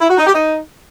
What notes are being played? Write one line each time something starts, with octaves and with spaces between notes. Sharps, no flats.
E4
F#4
D#4
G4
D#4